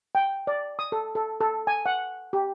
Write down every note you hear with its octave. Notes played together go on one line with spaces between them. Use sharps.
G5
D5
D#6
A4
A4
A4
G#5
F#5
G4